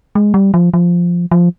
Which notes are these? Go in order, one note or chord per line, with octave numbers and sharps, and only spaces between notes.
G#3
G3
F3
F3
F3